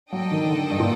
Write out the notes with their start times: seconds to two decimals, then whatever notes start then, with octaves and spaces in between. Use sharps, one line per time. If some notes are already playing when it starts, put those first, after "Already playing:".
0.12 F#3 D4 A4 D#5 G5
0.32 D#3
0.45 D#3
0.50 D3
0.70 G2
0.80 A#2